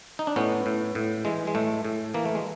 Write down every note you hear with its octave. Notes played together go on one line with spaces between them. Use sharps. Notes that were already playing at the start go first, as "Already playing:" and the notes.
D#4
D4
A2 B3 C#4
A2
A2
E3 G#3
G#3
A2 A3
A2
E3 A#3
A3
G#3